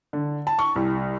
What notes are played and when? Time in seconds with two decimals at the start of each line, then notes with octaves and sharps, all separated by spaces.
0.13 D3
0.47 A5
0.59 C#6
0.76 C2